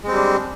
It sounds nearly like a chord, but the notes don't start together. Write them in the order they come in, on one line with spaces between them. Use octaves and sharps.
G#3 C4 G3 D4